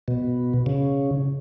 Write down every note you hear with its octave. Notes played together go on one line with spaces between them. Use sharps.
B2
C#3